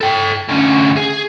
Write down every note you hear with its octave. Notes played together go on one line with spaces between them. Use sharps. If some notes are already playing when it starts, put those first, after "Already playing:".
A4 G5
D2 C#4
G#4